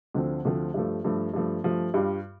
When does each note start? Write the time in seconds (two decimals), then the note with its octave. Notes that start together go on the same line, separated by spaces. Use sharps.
0.15 D2 D3 F3 A3 C4
0.45 D2 D3 F3 A3 C4
0.74 G2 F3 A3
1.04 G2 F3 A3
1.34 G2 F3 A3
1.64 G2 F3 A3
1.94 G2 G3 F4